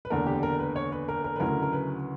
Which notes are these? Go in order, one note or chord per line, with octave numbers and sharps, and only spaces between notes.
B4
F#1 E2 D3 A#4
G4
A#4
B4
C#5
B4
A#4
A#4
B4
D2 C#3 F#3 C#4 E4 A#4
A#4
B4